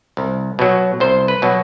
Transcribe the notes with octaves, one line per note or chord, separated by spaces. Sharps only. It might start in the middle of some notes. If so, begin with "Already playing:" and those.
C2
B2 F#3
C2 C5
B4
B2 F#3